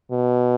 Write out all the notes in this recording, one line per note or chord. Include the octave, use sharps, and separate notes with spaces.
B2